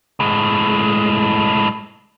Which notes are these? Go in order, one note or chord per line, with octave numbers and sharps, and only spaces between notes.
A2 G#3